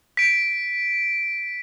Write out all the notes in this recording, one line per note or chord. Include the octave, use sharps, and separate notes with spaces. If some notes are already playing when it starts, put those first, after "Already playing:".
B6 D7